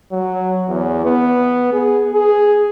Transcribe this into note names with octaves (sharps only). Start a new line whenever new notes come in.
F#3
E2
B3
G#4
G#4